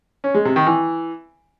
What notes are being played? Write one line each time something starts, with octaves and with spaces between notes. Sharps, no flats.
C#4
G#3
C3
D#3
E3